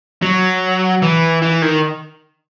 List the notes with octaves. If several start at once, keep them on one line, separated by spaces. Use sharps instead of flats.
F#3
E3
E3
D#3